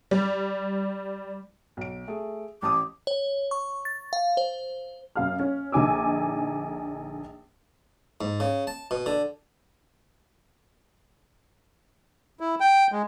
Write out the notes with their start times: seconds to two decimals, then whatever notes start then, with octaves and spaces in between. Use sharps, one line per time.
0.11 G3
1.77 B1 D7
2.08 A3 G#4
2.63 A1 A5 D6 D#6
3.07 C#5
3.51 C#6
3.85 A6
4.13 F5
4.37 C5
5.15 F#2 F5 F6
5.39 C#4
5.72 A#1 D3 D#4 G#5 D6 E6
8.21 G#2
8.40 C#3
8.67 A5
8.91 B2
9.06 D3
12.40 E4
12.60 G5
12.92 G#3